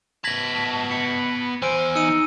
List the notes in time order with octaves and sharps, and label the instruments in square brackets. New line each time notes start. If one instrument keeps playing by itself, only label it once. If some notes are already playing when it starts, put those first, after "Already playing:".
[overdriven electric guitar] B3 A5 [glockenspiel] G#6 A#6 F#7 [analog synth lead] B6
[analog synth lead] B5 [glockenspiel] C#7
[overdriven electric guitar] E2 G#5 [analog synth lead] C5 [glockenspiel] E6 F6 D7
[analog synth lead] D#4 [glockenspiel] E6 C#7 D#7